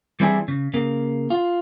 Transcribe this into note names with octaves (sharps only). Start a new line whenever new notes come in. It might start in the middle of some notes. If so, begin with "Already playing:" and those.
E3 G3 C4 D4 E4 G#4
C#3
C#3 A#3
F4